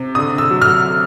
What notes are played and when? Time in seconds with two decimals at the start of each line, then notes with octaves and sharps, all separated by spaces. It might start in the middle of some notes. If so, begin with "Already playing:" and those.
Already playing: C3
0.15 D3 D#6
0.38 E6
0.50 F#3
0.62 F6